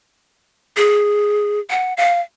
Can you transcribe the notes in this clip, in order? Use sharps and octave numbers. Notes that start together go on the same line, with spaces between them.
G#4
F#5
F5